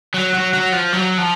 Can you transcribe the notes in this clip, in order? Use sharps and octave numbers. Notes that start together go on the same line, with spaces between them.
F#3
F#3
F#3
F3
F#3
F3